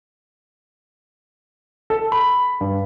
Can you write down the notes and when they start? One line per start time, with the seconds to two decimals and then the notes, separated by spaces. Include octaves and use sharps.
1.90 A4
2.12 B5
2.61 G2